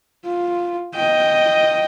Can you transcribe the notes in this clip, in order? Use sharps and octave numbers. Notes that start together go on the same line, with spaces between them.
F4
D#5 G5